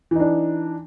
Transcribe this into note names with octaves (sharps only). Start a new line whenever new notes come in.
E3 D4 D#4